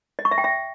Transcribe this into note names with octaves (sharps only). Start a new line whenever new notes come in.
D#5
C#6
E5
G5
E5